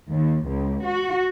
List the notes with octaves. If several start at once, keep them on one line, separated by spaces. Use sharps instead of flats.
D#2
C#2
F#4